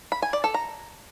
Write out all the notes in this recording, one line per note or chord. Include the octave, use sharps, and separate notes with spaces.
B5
G#5
D5
A4
A#5